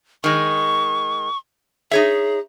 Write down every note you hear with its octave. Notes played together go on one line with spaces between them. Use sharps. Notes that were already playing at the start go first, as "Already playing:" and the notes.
D#3 G#3 C#6
D#4 G#4 C#5 E5